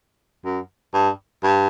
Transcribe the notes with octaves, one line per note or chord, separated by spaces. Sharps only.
F#2
G2
G2